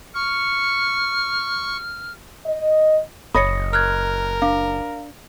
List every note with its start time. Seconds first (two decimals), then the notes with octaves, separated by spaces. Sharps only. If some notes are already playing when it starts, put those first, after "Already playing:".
0.14 C#6 F6
2.46 D#5
3.35 F#1 C#5 D#5 B5 D#6 A#6 C#7
3.73 A#4 F6 F#6 G#6
4.42 D4 F5